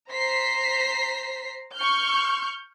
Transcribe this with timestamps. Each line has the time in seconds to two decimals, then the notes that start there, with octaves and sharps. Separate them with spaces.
0.12 C5 A#5 B6 C7
1.75 C#6 F6 G6